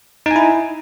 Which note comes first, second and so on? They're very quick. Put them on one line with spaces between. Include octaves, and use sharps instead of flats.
D#4 G#5 E4